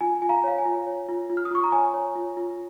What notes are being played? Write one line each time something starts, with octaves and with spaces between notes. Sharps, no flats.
F4 G#5
F4 G#5
F5 A#5
C#5 F5
G#5
F4
C#5
F4
F4
F6
D#6
F4 C#6
A#5
C#5 G#5
C#5
F4
F4